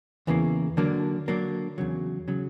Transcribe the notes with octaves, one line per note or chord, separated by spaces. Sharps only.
E2 C#3 E3 G3 A#3
D3 F#3 A#3 D4
D3 F#3 A#3 D4
E2 C#3 F#3
C#3 F#3